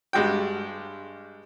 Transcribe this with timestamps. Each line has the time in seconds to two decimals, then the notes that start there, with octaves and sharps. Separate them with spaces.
0.13 G2 G3 G#3 F#4 G5